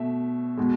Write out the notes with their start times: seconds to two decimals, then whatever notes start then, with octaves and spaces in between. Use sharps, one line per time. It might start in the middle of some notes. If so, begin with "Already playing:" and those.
Already playing: B2 A3 E5
0.57 B2 G#3